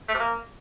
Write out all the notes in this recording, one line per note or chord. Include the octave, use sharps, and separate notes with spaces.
A3
C3
A#3